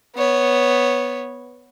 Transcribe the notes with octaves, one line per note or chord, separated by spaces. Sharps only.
B3 C#5